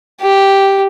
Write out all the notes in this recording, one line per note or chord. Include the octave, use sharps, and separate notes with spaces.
G4